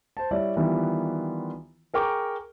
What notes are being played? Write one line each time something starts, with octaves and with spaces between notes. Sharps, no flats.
C5 A5
G3 E4 C#5 D5 E5
D#3 E3 G3 B3 E4 F4
G#4 A#4 G5 C#6 D6